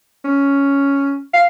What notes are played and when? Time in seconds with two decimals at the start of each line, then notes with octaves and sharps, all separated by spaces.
0.24 C#4
1.34 F5